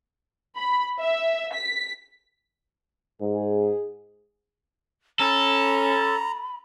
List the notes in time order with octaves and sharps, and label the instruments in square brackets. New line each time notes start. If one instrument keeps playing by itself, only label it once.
[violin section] B5
E5
B6
[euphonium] G#2 [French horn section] G#4
[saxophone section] C#4 [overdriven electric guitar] A4 [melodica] A#5 [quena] B5